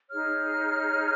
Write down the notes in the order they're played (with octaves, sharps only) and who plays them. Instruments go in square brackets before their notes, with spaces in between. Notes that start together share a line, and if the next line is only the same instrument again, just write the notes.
[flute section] D#4 G#4 C#5 F6